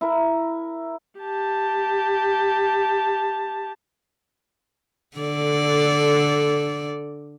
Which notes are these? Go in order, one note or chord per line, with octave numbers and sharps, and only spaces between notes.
E4 A#4
G4 A5
D3 A4 D5